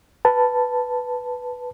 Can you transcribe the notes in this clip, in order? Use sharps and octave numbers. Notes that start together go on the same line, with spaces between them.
B4 A5